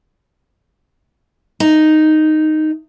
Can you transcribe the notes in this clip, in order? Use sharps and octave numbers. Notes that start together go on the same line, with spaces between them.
D#4